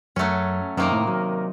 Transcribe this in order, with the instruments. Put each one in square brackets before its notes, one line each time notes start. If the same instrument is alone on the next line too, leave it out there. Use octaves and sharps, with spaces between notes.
[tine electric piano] F#2 [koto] F#3 A3 C#4
[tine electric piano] F#2 [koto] C3 D#3 A#3 D#4 A#4
[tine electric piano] A2
F#3